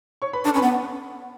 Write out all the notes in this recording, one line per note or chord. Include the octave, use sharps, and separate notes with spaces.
C#5 C#6
B4 B5
D4 A4 A5
C#4 B4 B5
B3